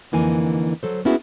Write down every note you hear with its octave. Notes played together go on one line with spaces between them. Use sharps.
F2 D3 E3 A#3 D#4 G#5
F#3 A4 C5
A#3 B3 C#4 E4 F#4 G#4